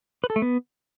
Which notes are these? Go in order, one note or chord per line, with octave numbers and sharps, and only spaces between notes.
B4
A4
A3
B3